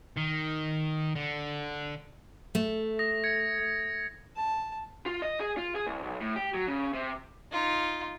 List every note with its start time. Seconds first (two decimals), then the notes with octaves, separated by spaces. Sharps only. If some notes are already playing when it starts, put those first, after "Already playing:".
0.17 D#3
1.16 D3
2.55 A3
2.99 D#6 A#6
3.24 G#6 C#7
4.37 A5
5.06 F4
5.22 D#5
5.40 G#4
5.58 F4
5.75 G#4
5.87 C2
6.03 B1
6.21 A2
6.36 G4
6.54 F#3
6.67 C#3
6.93 C3
7.52 D#4 F4